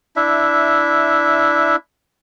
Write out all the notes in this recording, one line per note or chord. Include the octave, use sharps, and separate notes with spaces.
D4 E4 E5